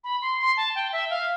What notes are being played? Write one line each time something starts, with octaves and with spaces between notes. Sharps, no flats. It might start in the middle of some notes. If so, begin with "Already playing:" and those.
B5
C6
C6
A5
G5
E5
F5